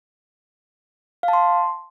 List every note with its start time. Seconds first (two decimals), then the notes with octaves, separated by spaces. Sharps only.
1.23 F5
1.28 A5
1.33 C6